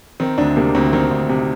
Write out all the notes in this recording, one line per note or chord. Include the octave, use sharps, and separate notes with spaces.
D#3 C4
D2 D4
C3 A#3
D2 C4
D#3 C4
D2
C3